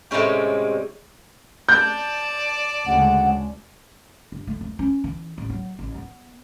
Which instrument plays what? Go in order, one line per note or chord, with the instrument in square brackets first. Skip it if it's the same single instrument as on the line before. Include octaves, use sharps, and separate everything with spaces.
[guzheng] A2 C3 G3 G#3 C#4 G4
[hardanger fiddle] D5 A5 [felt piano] G6
[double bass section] D2 C#3 G#3 [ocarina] F#5
[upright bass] G2
A3
F2
C#4
E3
A1
F#3
A1
B3